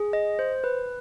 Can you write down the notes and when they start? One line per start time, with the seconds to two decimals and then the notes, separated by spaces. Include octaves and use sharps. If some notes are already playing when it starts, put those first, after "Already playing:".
Already playing: G#4
0.13 D#5
0.39 C5
0.64 B4